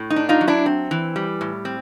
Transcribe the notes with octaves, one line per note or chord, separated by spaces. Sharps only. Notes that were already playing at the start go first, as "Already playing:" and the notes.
Already playing: A2
D#4
D4
D#4 F4
F#3
D4 E4
C4
E3
G3
A2
C4